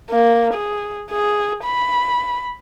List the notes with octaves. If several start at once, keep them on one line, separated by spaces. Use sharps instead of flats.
A#3
G#4
G#4
B5